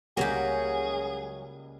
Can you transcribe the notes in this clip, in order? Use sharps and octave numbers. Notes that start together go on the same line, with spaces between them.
C#2 F#3 G3 A#3 C#4 G4 G#4